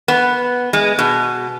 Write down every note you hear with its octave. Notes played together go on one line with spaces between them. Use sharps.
B3
G#3
B2